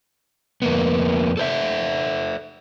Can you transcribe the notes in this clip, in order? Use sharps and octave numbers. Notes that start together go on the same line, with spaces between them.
F2 A#3 B3
A4 C5 E5